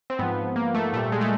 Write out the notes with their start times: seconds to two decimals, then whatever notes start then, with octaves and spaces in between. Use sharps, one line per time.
0.10 C4
0.19 G#2 F3 B3
0.56 A#3
0.74 A3
0.93 A#2 A3
0.96 G3
1.03 A3
1.12 G#3
1.21 A3